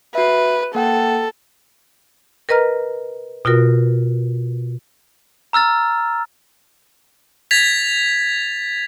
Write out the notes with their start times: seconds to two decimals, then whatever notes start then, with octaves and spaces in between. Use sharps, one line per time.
0.15 F#4 B4 E5
0.75 A#3 A4 F#5 G5
2.49 A#4 B4 D#5 A#5 F6
3.45 B2 F4 F#4 A#4
5.53 A#5 E6 F6 A6
7.51 G#6 A6 B6 F7